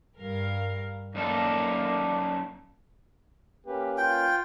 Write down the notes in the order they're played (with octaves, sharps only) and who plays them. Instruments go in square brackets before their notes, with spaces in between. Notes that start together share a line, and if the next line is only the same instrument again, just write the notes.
[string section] G2 A#4 F5
[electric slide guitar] F#2 D#4 A4 [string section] A#3 F5 [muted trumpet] D5
[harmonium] A#3 C#4 B4 [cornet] G4
[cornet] F4 [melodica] G5